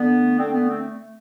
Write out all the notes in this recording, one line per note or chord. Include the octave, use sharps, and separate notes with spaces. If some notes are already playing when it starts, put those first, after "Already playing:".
Already playing: D3 B3
A3
D3 C4
B3
A3
C4